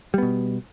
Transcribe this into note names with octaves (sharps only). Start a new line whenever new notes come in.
B2 G3 B3